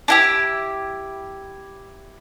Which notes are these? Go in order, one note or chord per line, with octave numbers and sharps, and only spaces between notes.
D4 E4 G4